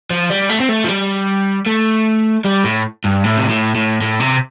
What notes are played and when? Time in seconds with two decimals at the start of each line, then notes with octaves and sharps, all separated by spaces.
0.10 F3
0.30 G3
0.49 A3
0.60 C4
0.69 A3
0.84 F3
0.89 G3
1.67 A3
2.45 G3
2.64 A2
3.04 G2
3.24 A2
3.38 C3
3.49 A2
3.75 A2
4.02 A2
4.21 C3